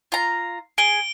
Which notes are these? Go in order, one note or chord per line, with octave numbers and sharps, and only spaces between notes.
F4 A#5
G#4 D7 G7